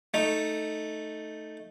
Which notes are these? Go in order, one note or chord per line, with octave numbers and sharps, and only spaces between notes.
A3 D#4